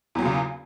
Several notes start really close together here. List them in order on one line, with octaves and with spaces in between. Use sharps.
E2 F#3 A#2 C#3